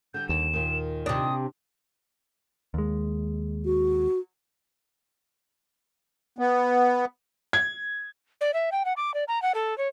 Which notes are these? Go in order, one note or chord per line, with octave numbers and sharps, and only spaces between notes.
D3 G3 G6
D#2 E7
A#2 D#3
C3 D4 D#6
D#2 G#3
F#4
B3
G#6
D5
E5
G5
F#5
D6
D5
A#5
F#5
A4
C#5